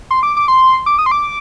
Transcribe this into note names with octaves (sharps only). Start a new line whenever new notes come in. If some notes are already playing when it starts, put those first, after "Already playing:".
C6
D6
D6
C6
D6
D#6
C6
D6